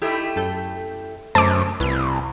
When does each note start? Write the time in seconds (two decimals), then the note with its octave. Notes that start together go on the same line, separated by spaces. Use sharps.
0.02 A3 D#4 E4 G4 A4 E5
0.36 F#2 A4 G6
1.35 F#2 C#3 A3 C5 A5 D6
1.80 C2 E4 B4